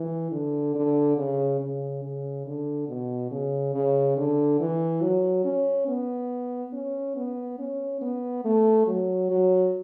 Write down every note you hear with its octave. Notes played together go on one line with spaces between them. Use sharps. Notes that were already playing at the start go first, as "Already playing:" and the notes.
Already playing: E3
D3
D3
C#3
C#3
C#3
D3
B2
C#3
C#3
D3
E3
F#3
C#4
B3
C#4
B3
C#4
B3
A3
F#3
F#3